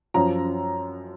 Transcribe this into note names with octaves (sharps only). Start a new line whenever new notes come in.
F#2 F3 A#5